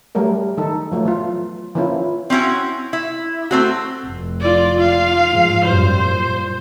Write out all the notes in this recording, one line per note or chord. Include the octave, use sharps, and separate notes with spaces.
F#3 G3 A3 A#4
D#3 D#4 A4
F3 F#3 A3
E3 F4
E3 F3 A#3 C#4 E4 F4
C4 C#4 E4 F#4
E4
A3 C4 F#4
F1
F4 D5
F4 F5
G#2 F3
F#2 A#2 G3 C5
A#2